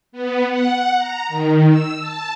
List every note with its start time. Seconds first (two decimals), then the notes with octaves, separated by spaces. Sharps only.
0.12 B3
0.50 F#5
0.97 A#5
1.29 D#3
1.70 E6
2.00 A5